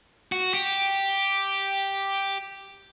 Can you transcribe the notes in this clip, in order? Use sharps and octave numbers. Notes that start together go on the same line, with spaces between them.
F#4
G4